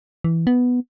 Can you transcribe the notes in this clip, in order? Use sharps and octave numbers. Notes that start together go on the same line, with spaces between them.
E3
B3